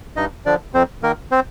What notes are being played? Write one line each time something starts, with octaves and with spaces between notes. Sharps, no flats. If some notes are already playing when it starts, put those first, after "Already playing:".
G2 D#4 D#5
D3 F3 D4 D5
F2 C4 C5
D#3 A#3 A#4
C4 C5